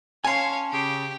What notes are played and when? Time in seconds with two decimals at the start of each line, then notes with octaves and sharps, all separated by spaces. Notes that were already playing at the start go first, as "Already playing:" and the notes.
0.25 C#4 C#5 F5 G#5 A5 C6
0.72 C#3 G4